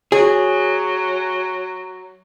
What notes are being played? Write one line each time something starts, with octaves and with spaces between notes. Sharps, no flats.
F#3 G#4